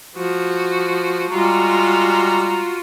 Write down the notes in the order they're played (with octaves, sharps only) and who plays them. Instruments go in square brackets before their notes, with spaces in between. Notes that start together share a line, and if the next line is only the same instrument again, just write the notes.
[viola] F3 F#4
[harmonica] G3 G#3 A#5 [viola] F4 F#4